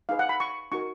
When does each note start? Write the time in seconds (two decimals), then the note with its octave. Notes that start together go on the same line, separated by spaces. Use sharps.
0.09 D#4 G#4 B4 F5
0.19 F#5
0.29 B5
0.40 C#6
0.72 D#4 F#4 A#4 C#6